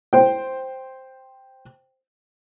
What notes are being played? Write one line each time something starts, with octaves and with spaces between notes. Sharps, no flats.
C5 G5